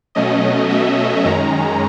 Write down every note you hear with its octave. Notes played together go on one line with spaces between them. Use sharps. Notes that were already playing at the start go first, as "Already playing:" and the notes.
B2 F#3 A3 C#4 D#5
E5
F#2 D#3 G#3 C#4 A#5